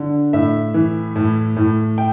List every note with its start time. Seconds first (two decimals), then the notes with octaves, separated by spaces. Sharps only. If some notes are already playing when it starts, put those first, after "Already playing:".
Already playing: D3
0.33 A2 E5
0.74 E3
1.16 A2
1.57 A2
1.98 G5